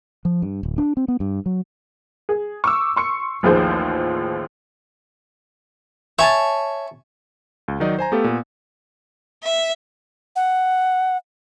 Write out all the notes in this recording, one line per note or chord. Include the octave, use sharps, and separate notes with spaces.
F3
G2
D1
D4
C4
B3
G2
F#3
G#4
C#6 D6 E6
C6 C#6 C#7
A1 D#2 F3 G#4 C5
C#5 E5 G#5 A5
C#2
D#3 F#3 D#4 D5 D#5
C5 G#5 A#5
A3 B3 G4 A4 F5
A#2 B3
E5
F#5